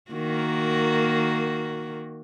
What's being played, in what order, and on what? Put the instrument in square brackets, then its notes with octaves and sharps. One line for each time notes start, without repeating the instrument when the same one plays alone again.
[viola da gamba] D#3 A#3 F#4